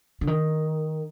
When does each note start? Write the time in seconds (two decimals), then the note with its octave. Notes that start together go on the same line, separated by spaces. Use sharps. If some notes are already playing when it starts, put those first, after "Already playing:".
0.21 D3
0.27 D#3